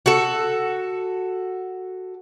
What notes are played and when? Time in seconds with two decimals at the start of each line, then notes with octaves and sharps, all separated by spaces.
0.06 F#4 A4